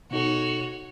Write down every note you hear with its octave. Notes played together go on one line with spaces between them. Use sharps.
B2 D#4 F#4 A4 C#5